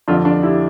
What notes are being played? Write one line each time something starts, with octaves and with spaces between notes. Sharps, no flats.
F2 D3 F3 D4 F4
D4 F4
E4 G4